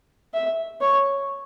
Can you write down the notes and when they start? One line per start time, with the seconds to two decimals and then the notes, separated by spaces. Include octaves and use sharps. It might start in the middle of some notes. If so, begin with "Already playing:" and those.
0.34 E5
0.81 C#5